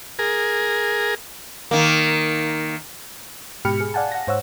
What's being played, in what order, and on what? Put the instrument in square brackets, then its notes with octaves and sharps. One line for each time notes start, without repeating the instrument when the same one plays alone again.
[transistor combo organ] G#4 A#4
[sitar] D#3 A#3
[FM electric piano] G#2 B2 G4 B5 F6 C#7
G#4
D5 F5 F#5 G#5 A5
F#5 A#6
G#2 C5 C#5 F#5 E6